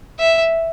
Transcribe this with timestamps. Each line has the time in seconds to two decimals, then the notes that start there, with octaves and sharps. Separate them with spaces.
0.19 E5